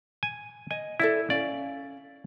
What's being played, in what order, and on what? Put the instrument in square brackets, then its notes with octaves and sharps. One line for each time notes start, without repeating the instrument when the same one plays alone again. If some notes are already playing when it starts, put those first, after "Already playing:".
[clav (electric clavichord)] G#5
[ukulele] D#5 [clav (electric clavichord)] G#5
[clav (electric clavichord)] E4 [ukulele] A4 D5 E5
[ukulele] C#4 F5 [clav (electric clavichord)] D5